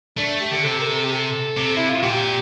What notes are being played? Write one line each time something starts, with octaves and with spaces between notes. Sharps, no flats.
A3 D4
G4
D3 G4
C3 A4
A#4
A4
G4
A4
C3
E4
F4
A#2 G4